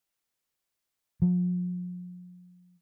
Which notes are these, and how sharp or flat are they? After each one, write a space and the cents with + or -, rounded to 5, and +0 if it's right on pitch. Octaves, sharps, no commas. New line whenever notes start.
F3 +45